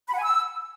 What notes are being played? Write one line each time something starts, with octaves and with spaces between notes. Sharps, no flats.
B5
F#5
G#5
E6